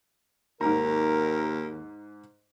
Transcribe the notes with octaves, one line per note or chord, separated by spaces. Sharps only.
D#2 G#2 A#4 A#5